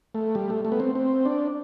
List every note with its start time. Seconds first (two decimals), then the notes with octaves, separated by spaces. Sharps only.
0.15 A3
0.35 G3
0.50 A3
0.65 A3
0.72 B3
0.80 C4
0.95 C4
1.25 D4